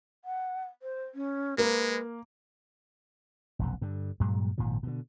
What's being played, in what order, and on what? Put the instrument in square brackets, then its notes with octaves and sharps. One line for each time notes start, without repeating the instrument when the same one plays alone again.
[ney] F#5
C5
C#4
[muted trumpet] G#3 [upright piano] A#3 [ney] B4
[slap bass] F1 B1 F#2
G2 D3
G2 A#2 F#3 G#3
G#1 A#2 D#3 F3
B2 D3